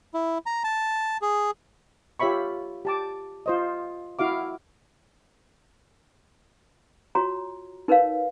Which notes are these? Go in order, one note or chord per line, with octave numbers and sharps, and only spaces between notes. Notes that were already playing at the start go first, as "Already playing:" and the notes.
E4
A#5
A5
G#4
F4 G4 C#5 E5 B5 C#6
G4 A5 D6
F4 C5 D#5
E4 F#4 F5 D6
F4 F#4 C#5 A#5
D#4 A#4 B4 C#5 F5